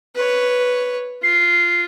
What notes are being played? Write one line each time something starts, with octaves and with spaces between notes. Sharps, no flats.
B4 C#5
F4 C7